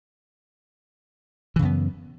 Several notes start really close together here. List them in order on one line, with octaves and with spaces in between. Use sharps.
E3 C#3 F#2 B3